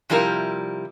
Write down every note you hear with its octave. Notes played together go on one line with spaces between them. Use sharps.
C3 F3 G3 E4 A#4